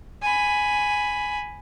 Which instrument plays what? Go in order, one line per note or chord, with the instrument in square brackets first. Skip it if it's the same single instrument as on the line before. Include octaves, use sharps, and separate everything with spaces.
[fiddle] G#5 B5